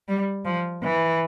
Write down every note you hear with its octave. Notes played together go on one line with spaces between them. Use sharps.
G3
F3
E3